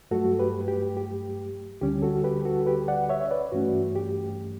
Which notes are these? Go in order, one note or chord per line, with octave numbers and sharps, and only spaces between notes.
G2 F#3 A3 F#4 A4
G4 B4
G4
G4
D2 D3 G3 C#4 G4
F#4 A4
G4 B4
F#4 A4
G4 B4
D5 F#5
C#5 E5
B4 D5
G2 E3 A3 C#4 F#4
G4